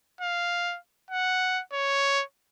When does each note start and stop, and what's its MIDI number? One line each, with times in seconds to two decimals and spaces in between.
0.21 0.78 77
1.11 1.61 78
1.73 2.23 73